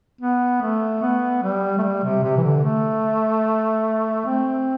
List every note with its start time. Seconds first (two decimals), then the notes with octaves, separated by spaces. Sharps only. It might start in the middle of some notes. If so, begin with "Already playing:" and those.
0.21 B3
0.62 A3
1.02 B3
1.43 G3
1.78 A3
1.83 G3
2.04 C3
2.23 C3
2.36 E3
2.44 D3
2.64 A3
4.26 C4